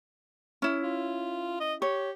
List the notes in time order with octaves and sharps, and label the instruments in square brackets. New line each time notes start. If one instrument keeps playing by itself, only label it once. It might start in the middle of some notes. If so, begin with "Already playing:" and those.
[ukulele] C#4 E4
[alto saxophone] F4
D#5
[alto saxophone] G4 [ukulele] C#5